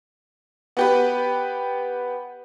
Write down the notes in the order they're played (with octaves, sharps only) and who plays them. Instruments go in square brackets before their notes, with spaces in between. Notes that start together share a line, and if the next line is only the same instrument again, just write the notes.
[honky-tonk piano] B3 G4 B4